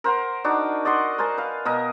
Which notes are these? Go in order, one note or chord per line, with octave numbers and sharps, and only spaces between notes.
A#4 C5 F#5 C6
D4 D#4 F#4
D5 D#5 F#5 C6
A#4 C5 G#5 A5
B4 F5
B2 A#4 D#5